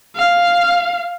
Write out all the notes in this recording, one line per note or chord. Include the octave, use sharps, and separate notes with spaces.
F5